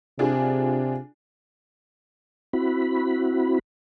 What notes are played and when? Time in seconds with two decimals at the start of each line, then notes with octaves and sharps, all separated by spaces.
0.19 C3 D4 F4 G#4
2.53 C4 E4 F#4 B5